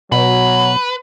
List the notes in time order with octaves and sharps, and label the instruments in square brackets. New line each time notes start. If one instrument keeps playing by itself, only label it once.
[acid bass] B2 [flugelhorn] F#3 [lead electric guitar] B4